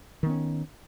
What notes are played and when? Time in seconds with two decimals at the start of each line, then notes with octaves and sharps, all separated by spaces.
0.23 D#3
0.26 B3
0.30 C#4